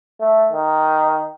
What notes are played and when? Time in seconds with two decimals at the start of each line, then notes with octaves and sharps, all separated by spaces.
0.21 A3
0.52 D#3